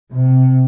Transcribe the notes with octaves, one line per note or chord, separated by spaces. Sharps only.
C3